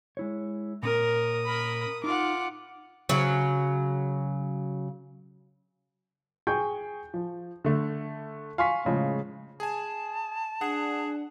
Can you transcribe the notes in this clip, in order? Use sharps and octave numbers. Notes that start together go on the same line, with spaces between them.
G#3 E4 C#5
A#2 C#4 A#4 D#6
A#4 B5
D#4 F4 F#5 D6
C#3 F#3
G#4 G5 G#5 C#6 G6
F3
D3 A3
F5 G#5 C6 C#6 B6
A2 C#3 F3 G#3
G#4 G#5 A5
D4 G#4 F#5